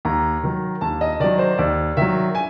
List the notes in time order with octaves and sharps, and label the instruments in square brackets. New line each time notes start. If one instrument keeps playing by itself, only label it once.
[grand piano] D#2 [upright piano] A#5
[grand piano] D#3 F#3
[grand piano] D#2 [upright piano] A5
[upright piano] D#5
[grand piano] D#3 F#3 [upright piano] D5
[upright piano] C5
[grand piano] D#2 [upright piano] D5
[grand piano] D#3 F#3 [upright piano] E5
[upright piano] G#5